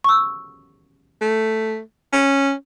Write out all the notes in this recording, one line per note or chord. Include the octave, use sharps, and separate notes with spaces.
C#6 E6
A3
C#4